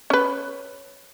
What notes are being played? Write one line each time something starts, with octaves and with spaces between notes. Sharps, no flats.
C#4 B4